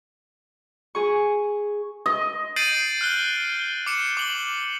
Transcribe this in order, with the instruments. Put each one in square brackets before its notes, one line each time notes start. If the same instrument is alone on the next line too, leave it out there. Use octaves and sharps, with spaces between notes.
[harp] G#4 C#6
[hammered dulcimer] D#5
[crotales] G6 A6 C7 D7 D#7 F#7
F6 F#6 G7
D6 C#7 E7
D6 F#7 G7